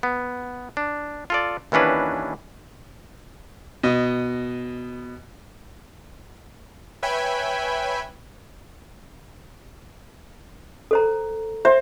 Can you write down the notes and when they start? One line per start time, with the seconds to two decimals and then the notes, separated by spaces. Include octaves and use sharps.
0.03 B3
0.77 D4
1.30 F4 A4 D5
1.72 D#2 E3 C#4 D4 B4
3.83 B2 D#5
7.03 B4 C#5 E5 G5 G#5 B5
10.91 A4 C5 A#5
11.65 C5 E5